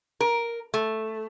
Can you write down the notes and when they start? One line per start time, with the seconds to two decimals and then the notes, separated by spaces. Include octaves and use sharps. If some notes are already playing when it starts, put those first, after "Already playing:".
0.21 A#4
0.74 A3